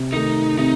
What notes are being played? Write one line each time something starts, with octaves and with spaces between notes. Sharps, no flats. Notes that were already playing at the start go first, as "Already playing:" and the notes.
Already playing: C3
D#3 A3 D#4
C3 D#4